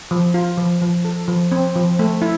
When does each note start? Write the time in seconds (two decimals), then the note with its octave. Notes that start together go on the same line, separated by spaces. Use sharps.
0.11 F3
0.34 F4
0.58 F3
0.81 F3
1.05 A4
1.28 F3
1.52 C4
1.76 F3
1.99 A3
2.22 E4